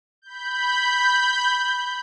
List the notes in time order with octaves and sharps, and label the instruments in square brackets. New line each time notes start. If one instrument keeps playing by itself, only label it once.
[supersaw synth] B5 G6